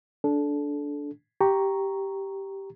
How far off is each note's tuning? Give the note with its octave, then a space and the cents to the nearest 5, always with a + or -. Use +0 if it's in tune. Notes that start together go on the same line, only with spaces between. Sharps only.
D4 -15 A4 -20
G4 -5 A#5 +0 C#6 +0